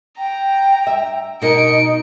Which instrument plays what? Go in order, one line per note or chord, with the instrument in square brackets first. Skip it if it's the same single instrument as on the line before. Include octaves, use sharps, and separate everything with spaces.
[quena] G5 [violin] A#5
[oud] E5
[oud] B2 A#4 D#5 [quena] D#4 [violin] C#7 D7